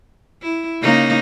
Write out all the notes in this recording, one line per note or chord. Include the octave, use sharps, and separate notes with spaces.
E4
C#3 A#3 D#4